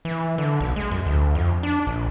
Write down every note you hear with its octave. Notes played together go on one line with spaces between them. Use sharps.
E3
D3
B1
G#3
F#2
D2
F2
D4
A#1